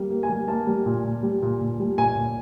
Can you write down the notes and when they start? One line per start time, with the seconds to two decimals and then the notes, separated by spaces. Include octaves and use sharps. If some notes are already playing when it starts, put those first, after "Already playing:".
Already playing: G3 A#3
0.10 A#3
0.23 G#5
0.29 G3
0.48 A#3 A5
0.67 G3
0.86 A#2
1.04 A#2
1.23 G3
1.42 A#2
1.61 A#2
1.80 G3
1.98 A#2 G#5
2.16 A#2